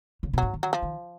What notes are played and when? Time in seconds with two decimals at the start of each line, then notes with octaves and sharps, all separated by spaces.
0.23 C#3
0.33 B2
0.38 G#2 F#3
0.53 D#3
0.63 F#3
0.73 F3
0.82 D#3